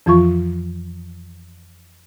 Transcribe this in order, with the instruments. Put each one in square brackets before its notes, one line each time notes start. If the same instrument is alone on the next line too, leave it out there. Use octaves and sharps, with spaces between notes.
[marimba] F2 E3 F3 F4 C#6